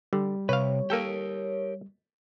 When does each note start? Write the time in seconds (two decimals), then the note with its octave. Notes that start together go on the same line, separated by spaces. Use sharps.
0.13 D3 G3
0.49 C3 B4 C#5 F5
0.90 A#3 G4 A4 A#4 G5